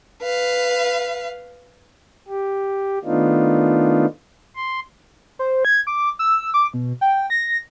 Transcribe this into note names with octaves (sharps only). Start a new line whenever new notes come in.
B4 F5
G4
D#3 A3 B3 D4 D#4 F4
C6
C5
G#6
D6
E6
D6
B2
G5
A#6